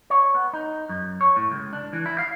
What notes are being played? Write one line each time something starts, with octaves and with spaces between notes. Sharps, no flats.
C#5
B3
D#4
F#2
C#5
A2
C#2
D4
E3
E4
F5